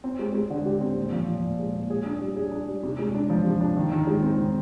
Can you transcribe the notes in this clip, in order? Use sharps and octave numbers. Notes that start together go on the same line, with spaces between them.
C4
G#3
G#3
D3
G4
C4
A#2
F3
A#2
A#2
G#3
A#2
G#4
D4
G3
G#4
D4
G3
C3
G#3
D4
F3
C3
D4
D#3
D#3
G#3
C4
D#3